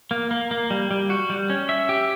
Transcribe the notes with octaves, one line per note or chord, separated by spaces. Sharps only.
A#3
A#3
A#3
G3
G3
F#4
G3
C#4
E5
G4